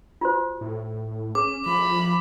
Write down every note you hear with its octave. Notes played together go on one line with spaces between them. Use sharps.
F4 F#4 C5
A2
C#4 G#4 D6
F3 B5